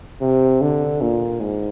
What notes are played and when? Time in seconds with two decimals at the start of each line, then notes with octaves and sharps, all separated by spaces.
0.21 C3
0.61 D3
1.01 A#2
1.41 G#2